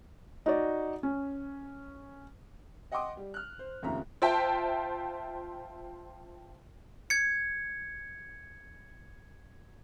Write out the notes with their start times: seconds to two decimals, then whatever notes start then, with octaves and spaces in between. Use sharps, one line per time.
0.46 D#4 F#4 D5
1.03 C#4
2.92 D#5 F#5 G5 C6 D6 D#6
3.17 G3
3.34 F6 F#6
3.59 C5
3.83 F1 D#2 C#3 F4 E5 A#5
4.22 F4 C5 E5 G5 A5
7.10 G#6 C#7